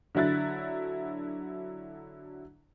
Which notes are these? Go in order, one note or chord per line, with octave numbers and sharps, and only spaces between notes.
D3 F#3 E4 F#6 A6